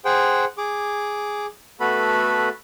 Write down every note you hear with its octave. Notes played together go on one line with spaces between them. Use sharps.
G#4 C5 F#5 G5
G#4 D6
A3 B3 F#4 A4 B4 B5